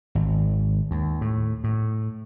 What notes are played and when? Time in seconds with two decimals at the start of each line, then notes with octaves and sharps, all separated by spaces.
0.15 G#1
0.91 D#2
1.21 A2
1.64 A2